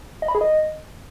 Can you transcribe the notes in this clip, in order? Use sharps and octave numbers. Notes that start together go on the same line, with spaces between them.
D#5
B5
G#4
D#5